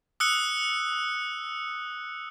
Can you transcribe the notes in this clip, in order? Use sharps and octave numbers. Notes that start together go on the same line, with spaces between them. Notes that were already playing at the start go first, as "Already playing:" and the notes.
D#6 E6 F#6 C#7